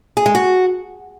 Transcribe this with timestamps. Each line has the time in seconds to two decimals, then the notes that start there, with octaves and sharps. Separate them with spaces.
0.17 G#4
0.26 G#3
0.35 F#4